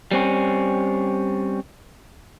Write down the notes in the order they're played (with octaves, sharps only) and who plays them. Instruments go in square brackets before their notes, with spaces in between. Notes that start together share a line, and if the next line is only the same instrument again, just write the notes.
[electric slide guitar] G3 C4 C#4